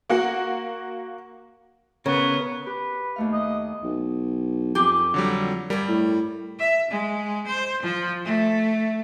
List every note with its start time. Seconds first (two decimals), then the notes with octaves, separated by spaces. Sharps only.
0.09 A#3 F#4 F#5
2.06 C#3 B3 A#4 C#5
2.67 G4 B4
3.16 D#2 A3 F5
3.33 D#5
3.84 B1
4.75 F2 G4 G#4
5.14 D3 F#3 G3
5.70 G2 G3 A#4
5.88 A2
6.59 E5
6.91 G#3
7.47 C5
7.82 F3
8.25 A3